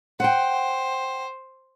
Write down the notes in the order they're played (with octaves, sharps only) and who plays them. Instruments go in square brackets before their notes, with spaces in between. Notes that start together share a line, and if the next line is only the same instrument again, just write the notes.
[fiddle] C5 [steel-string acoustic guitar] F#5 G5